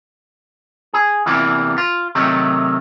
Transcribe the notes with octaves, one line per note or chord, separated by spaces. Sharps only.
G#4
E2 C3 E3 G3 A#3
F4
C3 D#3 F#3 A3